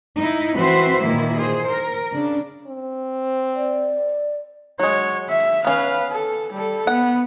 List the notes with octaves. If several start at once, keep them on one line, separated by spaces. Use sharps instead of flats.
D#4 E4
E3 C4 F#4 B4 C5 E5
A#2 D#3 E3 A#3 E4
G#4 C5
A#4
C#3 D4
C4
D5
F#3 G#3 C#5
E5
B3 C#4 B4 F5
A4
G3 A4
B3 F#5